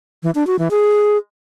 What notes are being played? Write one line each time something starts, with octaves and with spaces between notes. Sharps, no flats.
E3
D4
F#4
E3
G#4